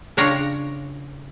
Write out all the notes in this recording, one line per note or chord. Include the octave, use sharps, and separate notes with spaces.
C#3 D4 F4 C#5 G5 A#5